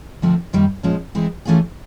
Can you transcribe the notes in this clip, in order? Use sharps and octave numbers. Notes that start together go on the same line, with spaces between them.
D2 C3 F3 A3 C4
F#2 D#3 G3 A#3
A#2 F3 G#3 C#4
E3 G#3 C4 E4
E3 A3 C#4 F4 G#4